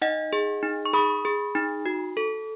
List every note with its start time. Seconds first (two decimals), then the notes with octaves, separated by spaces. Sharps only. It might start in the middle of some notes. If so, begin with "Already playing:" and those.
0.02 D#4 D#5 F#5
0.33 G#4
0.63 D#4
0.85 C#6
0.93 G#4 B5 D#6
1.25 G#4
1.55 D#4
1.86 F#4
2.17 A4